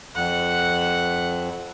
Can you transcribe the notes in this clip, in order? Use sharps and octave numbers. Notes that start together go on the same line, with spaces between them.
F2 F#5